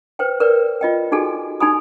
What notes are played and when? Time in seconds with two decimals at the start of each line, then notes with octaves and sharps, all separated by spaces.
0.19 B4 C5 G5
0.40 A#4 B4 D5
0.81 F4 D#5 G5
1.12 D#4 F#4 G#4 A4 G#5
1.60 D#4 G4 G#5 B5 D#6